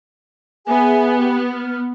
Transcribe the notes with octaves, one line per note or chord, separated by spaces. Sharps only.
B3 G#4 E5 G#5
G4
F6